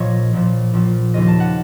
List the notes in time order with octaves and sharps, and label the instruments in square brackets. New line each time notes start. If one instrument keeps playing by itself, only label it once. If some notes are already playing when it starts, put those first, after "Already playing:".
Already playing: [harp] A#1 A#2 F3 C#5 D#5 F5
A#1 A#2 F3
A#1 A#2 F3
D#2 C#3 F3 D#5
A5
F#5